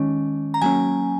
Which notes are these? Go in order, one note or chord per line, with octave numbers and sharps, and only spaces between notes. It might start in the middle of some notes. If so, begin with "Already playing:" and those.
Already playing: D#3 G#3 C#4
A#5
F#3 A#3 C#4 G#5